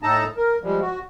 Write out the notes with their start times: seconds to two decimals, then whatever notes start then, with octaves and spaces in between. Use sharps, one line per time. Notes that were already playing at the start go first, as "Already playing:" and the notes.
0.03 A2 D#4 A4 A5 A#5
0.37 A#4
0.63 F3 G3 G#3
0.81 F#4